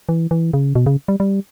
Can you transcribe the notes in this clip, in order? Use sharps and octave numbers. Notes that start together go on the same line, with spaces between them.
E3
E3
C#3
B2
C#3
G3
G3